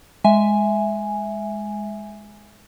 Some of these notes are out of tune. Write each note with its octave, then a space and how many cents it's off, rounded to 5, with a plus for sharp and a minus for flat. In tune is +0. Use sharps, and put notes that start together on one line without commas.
G#3 +0 E5 +0 G#5 +0